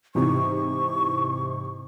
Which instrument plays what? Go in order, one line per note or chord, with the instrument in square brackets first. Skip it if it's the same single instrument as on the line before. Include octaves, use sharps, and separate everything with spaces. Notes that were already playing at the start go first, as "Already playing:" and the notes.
[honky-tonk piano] G#2 C3 E3 [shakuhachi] C#6